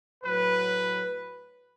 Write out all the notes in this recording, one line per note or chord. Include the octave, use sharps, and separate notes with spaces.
A2 F#3 B4